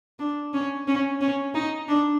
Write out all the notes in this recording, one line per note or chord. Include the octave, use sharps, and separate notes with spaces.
D4
C#4
C#4
C#4
D#4
D4